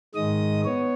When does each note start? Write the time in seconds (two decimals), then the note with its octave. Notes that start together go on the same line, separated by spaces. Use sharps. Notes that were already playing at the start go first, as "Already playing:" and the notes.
0.15 G#2 D#3 G#3 D#5 D#6
0.65 B3 C#5